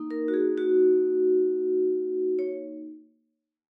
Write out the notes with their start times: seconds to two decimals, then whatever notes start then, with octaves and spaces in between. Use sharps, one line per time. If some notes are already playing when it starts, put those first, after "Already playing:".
Already playing: A#3 D#4
0.11 A#4
0.28 F#4
0.34 G#4
0.58 F#4
2.39 C#5